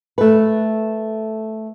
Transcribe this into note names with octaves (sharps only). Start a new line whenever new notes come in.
A3 B4